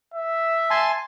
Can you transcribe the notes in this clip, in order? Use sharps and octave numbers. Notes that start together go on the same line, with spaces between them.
E5
G#5 A5 C6